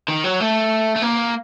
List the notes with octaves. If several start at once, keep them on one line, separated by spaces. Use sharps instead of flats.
D#3
F#3
A3
A3
A#3